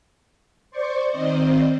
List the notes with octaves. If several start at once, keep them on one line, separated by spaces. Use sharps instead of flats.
C5 D5 C#6
D#3 C4 C5 D5 D#5